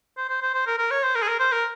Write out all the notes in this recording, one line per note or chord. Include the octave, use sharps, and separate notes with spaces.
C5
C5
C5
C5
A#4
A#4
C#5
C5
A#4
G#4
A#4
C5
A#4